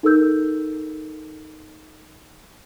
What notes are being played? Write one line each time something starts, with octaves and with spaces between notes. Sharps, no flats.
D#4 A4 A#4 E6 G6